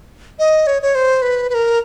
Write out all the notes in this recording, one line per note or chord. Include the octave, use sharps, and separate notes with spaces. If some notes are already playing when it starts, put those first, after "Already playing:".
D#5
C#5
C#5
C5
B4
B4
A#4